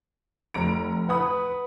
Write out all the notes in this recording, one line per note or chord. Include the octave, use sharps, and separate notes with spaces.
F1 A#5 D7
B4 F#5 B5 D#6